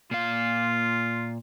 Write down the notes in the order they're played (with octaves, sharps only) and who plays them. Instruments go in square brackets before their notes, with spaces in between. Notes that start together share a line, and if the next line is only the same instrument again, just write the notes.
[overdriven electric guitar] A#2 F5 [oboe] F4